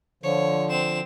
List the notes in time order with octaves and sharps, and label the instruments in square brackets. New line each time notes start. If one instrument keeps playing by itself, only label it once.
[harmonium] D3 F3 [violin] C#5
[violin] C4 E7